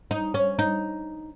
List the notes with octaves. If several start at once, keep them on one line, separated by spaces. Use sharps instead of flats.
D#4
C#4
D#4